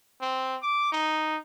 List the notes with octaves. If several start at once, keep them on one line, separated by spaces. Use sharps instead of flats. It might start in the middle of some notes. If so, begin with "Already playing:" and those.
C4
D6
D#4